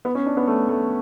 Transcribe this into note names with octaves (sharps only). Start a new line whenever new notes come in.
B3
C#4
D4
B3
A3
A3